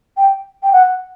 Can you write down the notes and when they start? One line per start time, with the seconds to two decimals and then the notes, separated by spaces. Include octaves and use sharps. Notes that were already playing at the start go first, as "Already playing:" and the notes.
0.17 G5
0.63 G5
0.73 F#5